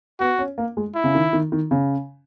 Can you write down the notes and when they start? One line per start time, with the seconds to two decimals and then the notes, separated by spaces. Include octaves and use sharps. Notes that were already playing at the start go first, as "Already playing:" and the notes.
0.20 B3 F#4
0.39 C#4
0.58 A#3
0.77 G#3
0.95 E4
1.04 C#3
1.15 D#3
1.33 D#3
1.52 D#3
1.71 C#3